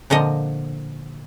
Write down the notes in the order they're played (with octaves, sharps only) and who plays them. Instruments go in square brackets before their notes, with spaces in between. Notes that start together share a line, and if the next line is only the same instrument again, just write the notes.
[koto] A#2 D3 F3 D#5